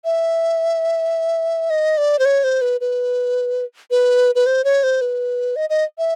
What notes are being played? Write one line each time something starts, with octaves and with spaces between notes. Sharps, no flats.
E5
D#5
D5
C5
C#5
C5
B4
B4
B4
B4
C5
C#5
C5
B4
D#5
D#5
E5